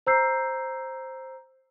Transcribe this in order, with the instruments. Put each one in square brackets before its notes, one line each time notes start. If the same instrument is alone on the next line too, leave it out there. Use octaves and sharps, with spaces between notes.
[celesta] C5 A#5 E6 G6 C7